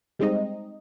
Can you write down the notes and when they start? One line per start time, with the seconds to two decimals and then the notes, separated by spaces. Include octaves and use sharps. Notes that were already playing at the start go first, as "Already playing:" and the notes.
0.19 G3 G#3 C4 D#4 D#5